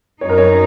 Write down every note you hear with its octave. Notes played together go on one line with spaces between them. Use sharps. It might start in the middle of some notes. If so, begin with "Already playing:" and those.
F#2 F#3 D#4 C#5
A#4
C#5